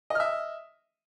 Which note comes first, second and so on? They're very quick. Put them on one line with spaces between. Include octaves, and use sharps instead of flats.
D#5 F6 E5